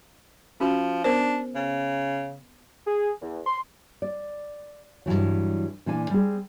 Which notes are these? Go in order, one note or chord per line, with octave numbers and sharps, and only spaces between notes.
F3 C#4 F#4
B3 D4 A#4 C5
C#3
G#4
E2
C6
D5
G2 C3 E3 F#3
A#2 E3 D4 G#5
G3 C4 G#4